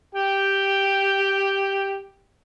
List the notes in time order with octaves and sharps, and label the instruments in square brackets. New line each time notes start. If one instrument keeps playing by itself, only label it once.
[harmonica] G4 G5